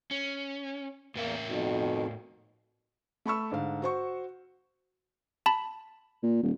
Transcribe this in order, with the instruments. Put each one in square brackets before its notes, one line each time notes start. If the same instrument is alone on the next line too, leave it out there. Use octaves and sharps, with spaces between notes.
[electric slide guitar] C#4
[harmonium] E2 A#3 [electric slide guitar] A2 A#4 E5
[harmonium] F2 B2 D#3
[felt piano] A3 B5 C#6 E6
G#2 D3 F5
F#4 C5 C#6
[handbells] A5 B5
[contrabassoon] A#2
D#1